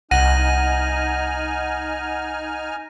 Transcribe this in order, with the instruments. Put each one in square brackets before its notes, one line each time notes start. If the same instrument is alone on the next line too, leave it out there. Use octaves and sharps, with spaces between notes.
[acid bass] C2 [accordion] D#4 G#5 F6 [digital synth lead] F#5 [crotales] A#6 D#7